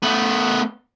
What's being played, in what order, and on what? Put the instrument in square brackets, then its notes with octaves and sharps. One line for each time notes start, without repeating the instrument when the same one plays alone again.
[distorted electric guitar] A3 B3